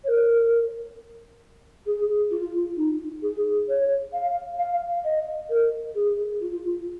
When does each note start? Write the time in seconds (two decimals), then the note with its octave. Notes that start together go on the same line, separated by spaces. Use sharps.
0.04 C#5
0.08 A#4
1.86 G#4
2.31 F4
2.77 D#4
3.22 G#4
3.68 C#5
4.13 F5
4.59 F5
5.04 D#5
5.49 A#4
5.95 G#4
6.41 F4